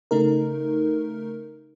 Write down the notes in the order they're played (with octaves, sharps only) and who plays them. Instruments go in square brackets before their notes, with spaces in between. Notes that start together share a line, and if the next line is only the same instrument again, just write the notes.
[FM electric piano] C#3 A3 D#4 A#4